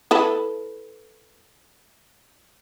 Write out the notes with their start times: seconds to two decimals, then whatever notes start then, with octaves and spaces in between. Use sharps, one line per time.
0.11 E4 A4 B4